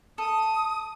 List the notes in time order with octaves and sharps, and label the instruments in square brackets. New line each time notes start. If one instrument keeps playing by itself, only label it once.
[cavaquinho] A4 [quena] D#6